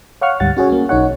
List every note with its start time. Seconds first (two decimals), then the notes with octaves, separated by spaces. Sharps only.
0.21 C#5 F5 F#5 C#6 F6
0.40 D2 G#2 G3 F#5 A6
0.57 C#4 F#4 G#4 C#5
0.70 A#3 C#4
0.89 B1 D#4 C#5 F#5